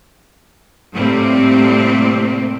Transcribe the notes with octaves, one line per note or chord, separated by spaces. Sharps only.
A2 C3 G3 A3 A#3 C4